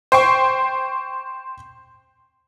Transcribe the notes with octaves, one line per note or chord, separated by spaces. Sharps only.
C5 G5 C#6